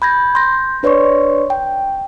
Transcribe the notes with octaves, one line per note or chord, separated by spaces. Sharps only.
B5 G6 G#6 A#6
C6 G6 A#6
D4 B4 C#5 D5 C6 C#6
G5